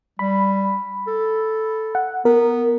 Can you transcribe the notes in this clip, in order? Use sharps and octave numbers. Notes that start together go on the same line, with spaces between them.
G3 B5
A4
F#5
B3 A#4